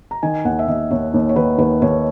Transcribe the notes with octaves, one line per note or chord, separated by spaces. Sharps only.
A#5
D#3 G#5
D#2 F#5
E5
D#2 D#5
D#2 C#5
D#2
C#5
D#3 B4
D#2 B4
D#2 C#5